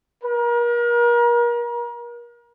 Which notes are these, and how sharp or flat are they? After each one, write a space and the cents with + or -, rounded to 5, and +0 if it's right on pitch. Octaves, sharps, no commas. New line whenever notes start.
A#4 +35